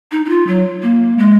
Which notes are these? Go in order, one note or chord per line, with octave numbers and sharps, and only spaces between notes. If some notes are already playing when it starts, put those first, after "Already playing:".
D#4
D#4
F4
F#3
A#3
G#3